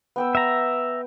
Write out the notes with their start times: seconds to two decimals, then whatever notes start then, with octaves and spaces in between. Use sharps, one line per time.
0.16 B3 G5 E6
0.35 E5 A#5